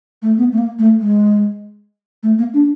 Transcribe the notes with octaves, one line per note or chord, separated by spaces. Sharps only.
A3
B3
A3
A#3
A3
G#3
A3
A#3
D4